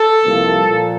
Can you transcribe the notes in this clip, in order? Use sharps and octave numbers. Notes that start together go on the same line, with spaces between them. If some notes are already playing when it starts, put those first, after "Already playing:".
Already playing: A4
C2 C3 F3 A#3
A#2 F3